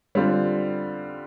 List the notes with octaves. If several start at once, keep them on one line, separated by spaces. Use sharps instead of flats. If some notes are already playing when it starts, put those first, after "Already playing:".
D3 G3 C4 F4